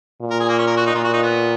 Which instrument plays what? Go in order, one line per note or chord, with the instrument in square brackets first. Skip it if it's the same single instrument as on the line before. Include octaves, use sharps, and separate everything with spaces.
[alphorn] A#2
[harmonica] A#4
G#4
A#3
C#4
A#4
F#4
D#4
[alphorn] A#2 [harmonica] F4
[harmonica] F#4
D#4
B3